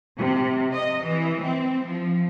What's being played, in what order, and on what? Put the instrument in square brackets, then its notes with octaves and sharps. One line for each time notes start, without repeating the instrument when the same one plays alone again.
[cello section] C3
D#5
E3
C4
F3